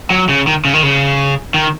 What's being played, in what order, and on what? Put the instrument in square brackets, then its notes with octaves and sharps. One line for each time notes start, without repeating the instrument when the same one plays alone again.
[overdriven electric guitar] F#3
C#3
D#3
C#3
D#3
C#3
D#3